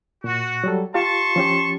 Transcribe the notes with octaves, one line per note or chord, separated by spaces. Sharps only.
A#2 F#4
F#3 G3 A4
F4 G4 F5 A5 C6 C#6
F3 C#4 G4